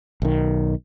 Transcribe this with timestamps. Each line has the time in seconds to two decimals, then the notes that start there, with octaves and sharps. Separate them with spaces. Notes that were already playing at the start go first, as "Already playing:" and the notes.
0.22 B1 D#3